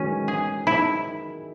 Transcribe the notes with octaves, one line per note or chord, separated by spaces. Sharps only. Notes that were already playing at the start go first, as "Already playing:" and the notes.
Already playing: D#3 E3 F#3 G#3 C#4
G#3 G#4
E4